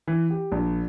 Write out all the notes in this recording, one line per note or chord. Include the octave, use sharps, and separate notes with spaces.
E3
G4
A#1